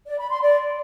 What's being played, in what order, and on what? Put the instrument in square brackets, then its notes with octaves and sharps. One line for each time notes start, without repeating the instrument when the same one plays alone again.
[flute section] D5
B5
C6
D5